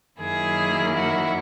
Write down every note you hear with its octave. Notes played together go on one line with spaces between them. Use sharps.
F#2 D#3 F#3 A#3 E4 G#4
F#4